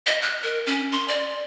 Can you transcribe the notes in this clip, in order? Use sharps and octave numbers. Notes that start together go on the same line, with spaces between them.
D#5
F#6
A#4
C#4
C6
D5